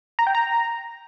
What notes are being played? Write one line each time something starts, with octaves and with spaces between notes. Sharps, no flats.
A#5
G5
A#5